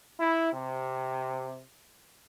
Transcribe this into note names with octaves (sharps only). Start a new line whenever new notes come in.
E4
C3